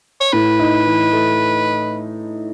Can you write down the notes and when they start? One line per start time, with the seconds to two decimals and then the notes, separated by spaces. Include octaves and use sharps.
0.21 C#5
0.33 A2 B4
0.59 D#4
0.86 E3
1.12 A3